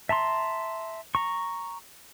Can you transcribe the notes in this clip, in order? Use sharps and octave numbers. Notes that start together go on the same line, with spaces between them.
E5 A5 A#5 C6
A#5 C#6